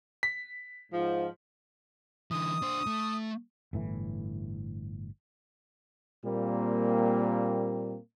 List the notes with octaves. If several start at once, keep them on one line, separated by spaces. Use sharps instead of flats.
B6
G#2 F3
D3 E3 D#6
D4 C5
A3
G1 A2 E3
A#2 G3 A#3 C4